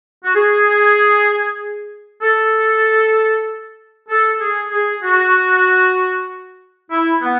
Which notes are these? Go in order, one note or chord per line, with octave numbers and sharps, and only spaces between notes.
F#4
G#4
A4
A4
G#4
G#4
F#4
E4
B3